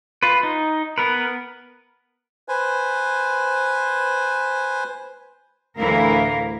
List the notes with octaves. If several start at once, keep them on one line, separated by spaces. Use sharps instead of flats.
F4 B4
D#4
B3 A#4 B4
B4 C5 G#5
D2 A2 E3 E4 A#4 F5